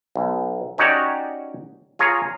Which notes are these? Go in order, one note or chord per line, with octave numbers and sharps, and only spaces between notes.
B1
C#4 D#4 F#4 G4 C#5 D5
F4 G#4 C#5 A#5